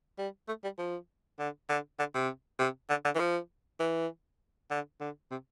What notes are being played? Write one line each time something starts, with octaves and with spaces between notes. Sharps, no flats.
G3
A3
G3
F3
D3
D3
D3
C3
C3
D3
D3
E3
F3
E3
D3
D3
C3